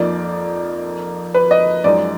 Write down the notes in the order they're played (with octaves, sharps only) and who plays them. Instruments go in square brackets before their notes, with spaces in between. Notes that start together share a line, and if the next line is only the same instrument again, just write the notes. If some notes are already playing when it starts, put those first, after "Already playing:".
Already playing: [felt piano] F2 F3 A#3 D#4 [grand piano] D5
[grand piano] B4
D#5
[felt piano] F#2 F3 G#3 D#4 [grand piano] D5